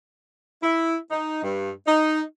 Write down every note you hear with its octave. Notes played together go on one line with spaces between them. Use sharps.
E4
D#4
G2
D#4